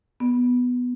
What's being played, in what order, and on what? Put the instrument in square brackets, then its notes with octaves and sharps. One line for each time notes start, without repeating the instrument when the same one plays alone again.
[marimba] B3